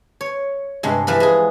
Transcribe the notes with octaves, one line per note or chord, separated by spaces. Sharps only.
C#5
G2 C3 G#3
E3 F3 B4 B5
G#3 G#4